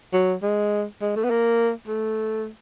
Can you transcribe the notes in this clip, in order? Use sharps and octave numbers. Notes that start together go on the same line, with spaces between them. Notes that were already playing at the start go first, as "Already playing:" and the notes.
F#3
G#3
G#3
A3
B3
A#3
A3